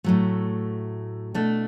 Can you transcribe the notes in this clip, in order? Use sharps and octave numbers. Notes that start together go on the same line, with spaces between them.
A2 F#3 A3
B2 A3 D4